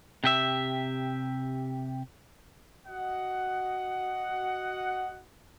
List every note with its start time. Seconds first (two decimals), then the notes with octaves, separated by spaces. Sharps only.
0.24 C3 G4 E5
2.88 F#4 D#5 F#5